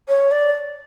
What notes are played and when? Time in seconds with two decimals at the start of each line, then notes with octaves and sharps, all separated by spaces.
0.08 C#5
0.31 D5